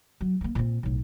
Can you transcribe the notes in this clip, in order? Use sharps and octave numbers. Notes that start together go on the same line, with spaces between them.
F#3
G#3 A#3
A#2 C4
B1 A2